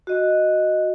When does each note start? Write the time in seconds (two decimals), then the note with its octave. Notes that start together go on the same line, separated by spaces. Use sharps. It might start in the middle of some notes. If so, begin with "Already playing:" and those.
0.07 F#4 D#5